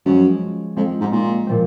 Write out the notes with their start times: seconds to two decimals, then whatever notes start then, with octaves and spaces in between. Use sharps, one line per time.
0.05 F#2 F3 G#3 C#4 G#4
0.76 F2 G#3 C4 F4
1.00 G#2
1.12 A#2
1.47 A#2 F3 C4